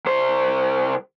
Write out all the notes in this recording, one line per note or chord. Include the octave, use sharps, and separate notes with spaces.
C2 C5